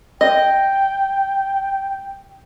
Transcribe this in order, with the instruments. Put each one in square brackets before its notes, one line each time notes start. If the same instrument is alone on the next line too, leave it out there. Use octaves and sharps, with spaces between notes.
[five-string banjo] D#5 [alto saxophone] G5